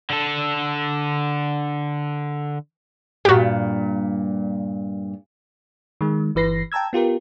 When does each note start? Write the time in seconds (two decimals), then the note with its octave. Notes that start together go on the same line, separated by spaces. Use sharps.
0.10 D3 A4
3.25 G2 A#2 F#4 G4
6.01 D#3 G#3
6.35 G1 E3 B4 A#6 C7
6.72 G5 A5 A#5 E6 G#6
6.93 B3 F4 G4 A#4